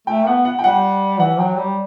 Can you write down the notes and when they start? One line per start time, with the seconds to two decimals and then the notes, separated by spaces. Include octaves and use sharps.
0.07 A3 G5
0.26 B3 F#5
0.45 F#5
0.59 G5
0.64 G3 F#5
1.20 E3 F#5
1.39 F#3 G5
1.58 G3